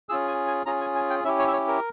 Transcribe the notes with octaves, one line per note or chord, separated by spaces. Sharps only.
C#4 F4 G#4 E6
G#5
G#5
C#4 F4 G#4 A#5
G#5
G#5
G5
C#4 E4 G4 E5
C#5
E5
C#5
A#4